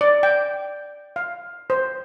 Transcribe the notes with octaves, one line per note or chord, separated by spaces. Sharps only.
D5
G5
F5
C5